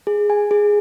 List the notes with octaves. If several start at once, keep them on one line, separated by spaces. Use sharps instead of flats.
G#4
G#5
G#4